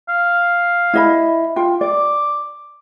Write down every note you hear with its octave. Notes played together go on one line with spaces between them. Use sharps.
F5
E4 D#5 B5
F4 G5
D5 D6